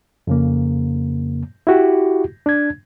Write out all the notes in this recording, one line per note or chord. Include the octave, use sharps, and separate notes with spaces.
F2 C#3 A#3
E4 F#4 G4
D4 G#6